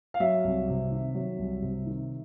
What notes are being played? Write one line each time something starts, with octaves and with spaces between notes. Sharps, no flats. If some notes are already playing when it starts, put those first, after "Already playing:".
F5
F#3 E5
C2
C3
D#3
F#3
C2
C3
D#3